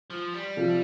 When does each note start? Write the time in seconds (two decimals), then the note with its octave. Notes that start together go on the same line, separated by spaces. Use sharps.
0.10 F3
0.34 G3
0.57 C3 F3 C4 F4 A4